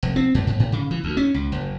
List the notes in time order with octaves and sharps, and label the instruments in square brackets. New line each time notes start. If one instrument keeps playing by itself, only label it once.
[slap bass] F1
C4
F#2
G#2
A2
C#3
E3
D2
C#4
C#2
F#1